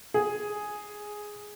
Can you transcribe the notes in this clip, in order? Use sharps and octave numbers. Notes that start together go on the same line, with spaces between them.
G#4